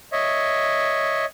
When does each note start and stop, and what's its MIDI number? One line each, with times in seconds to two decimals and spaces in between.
0.12 1.25 73
0.12 1.25 75
0.12 1.25 76